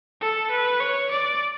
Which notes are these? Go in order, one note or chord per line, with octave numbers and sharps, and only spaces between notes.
A4
B4
C#5
D5